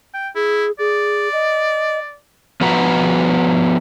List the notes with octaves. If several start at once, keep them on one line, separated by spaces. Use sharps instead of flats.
G5
E4 G#4
G#4 D5
D#5
F3 B3 F#4 B4 F#5 A#5